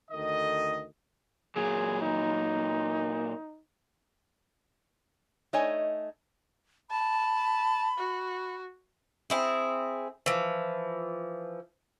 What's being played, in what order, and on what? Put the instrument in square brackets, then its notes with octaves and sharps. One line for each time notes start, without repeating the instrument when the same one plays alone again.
[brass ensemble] D2 D#3 A4 D#5
[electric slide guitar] A#2 F#3 [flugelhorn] G#4
[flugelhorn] D#4
[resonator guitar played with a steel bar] A3 D#4 C#5 D#5 G#5
[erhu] A5 [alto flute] B5
[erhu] F#4
[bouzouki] C4 E4 G#4
E3 F3